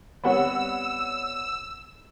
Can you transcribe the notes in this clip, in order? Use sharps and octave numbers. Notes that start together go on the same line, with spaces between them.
G3 B3 C4 C#5 F#5 B5 E6